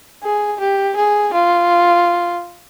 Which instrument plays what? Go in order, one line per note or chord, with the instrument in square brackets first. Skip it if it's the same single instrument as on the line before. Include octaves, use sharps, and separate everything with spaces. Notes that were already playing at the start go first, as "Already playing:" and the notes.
[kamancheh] G#4
G4
G#4
F4